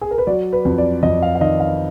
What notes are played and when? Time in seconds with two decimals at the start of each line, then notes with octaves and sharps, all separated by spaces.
0.01 G#4
0.11 A#4
0.18 B4
0.27 F#3 D5
0.53 B4
0.65 F2
0.78 D5
1.03 F2 D#5
1.22 F5
1.35 F5
1.41 D#3 D#5
1.60 F5